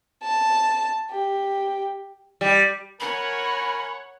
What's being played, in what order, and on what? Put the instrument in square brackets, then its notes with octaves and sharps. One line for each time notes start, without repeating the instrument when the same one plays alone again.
[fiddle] A5
G4
[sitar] G3
[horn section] A#4 G#5 [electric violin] C#5 F#5 [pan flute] B5